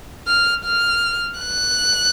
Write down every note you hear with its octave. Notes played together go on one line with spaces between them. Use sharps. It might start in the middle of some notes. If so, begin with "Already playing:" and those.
F6
F6
F#6